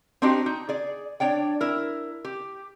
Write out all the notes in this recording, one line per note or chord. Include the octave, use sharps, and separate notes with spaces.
C4 D4 D#4 F#4 G4
D#4
G#4 D5
D4 C#5 D5 G5
E4 A#4
G4